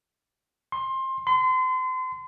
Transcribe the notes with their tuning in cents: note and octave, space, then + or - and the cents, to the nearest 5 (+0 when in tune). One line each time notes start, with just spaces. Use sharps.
C6 +20
C6 -35